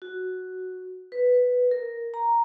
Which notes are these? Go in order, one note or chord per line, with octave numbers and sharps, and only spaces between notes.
F#4
B4
A#4
A#5